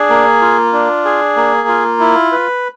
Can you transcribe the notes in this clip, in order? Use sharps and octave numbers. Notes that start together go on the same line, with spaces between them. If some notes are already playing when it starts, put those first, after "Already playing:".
Already playing: D4 G#4
A#3
F4
D4
G#4
A#3
F4
E4
B4